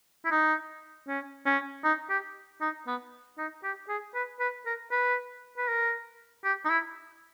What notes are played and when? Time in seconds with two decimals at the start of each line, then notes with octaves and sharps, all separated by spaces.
0.25 E4
0.31 D#4
1.07 C#4
1.46 C#4
1.84 D#4
2.10 G4
2.61 D#4
2.87 B3
3.38 D#4
3.64 G4
3.89 G#4
4.14 B4
4.40 B4
4.66 A#4
4.91 B4
5.58 B4
5.68 A#4
6.44 G4
6.65 D#4
6.70 E4